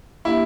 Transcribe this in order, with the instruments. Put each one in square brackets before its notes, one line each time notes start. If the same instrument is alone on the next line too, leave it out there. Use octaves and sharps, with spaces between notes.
[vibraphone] A#3 D4 G4 [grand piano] E4